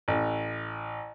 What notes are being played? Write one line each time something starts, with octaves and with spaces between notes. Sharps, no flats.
A1